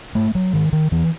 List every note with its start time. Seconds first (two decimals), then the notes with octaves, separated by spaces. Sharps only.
0.15 G#2 A3
0.35 F#3
0.53 G#2 D#3
0.73 D#3
0.91 E2 E3